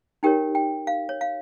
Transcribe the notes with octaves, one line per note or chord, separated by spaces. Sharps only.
D#4 G4 A#4 C#5 G5
G5
F5
C#5
F5